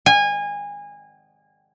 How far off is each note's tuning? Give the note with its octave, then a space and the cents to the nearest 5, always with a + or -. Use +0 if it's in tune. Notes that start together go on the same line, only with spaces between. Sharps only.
G#5 -25